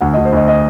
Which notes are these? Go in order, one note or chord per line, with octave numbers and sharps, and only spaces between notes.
D2 F#5
D#5
D2
C5
D2 D#5
D#5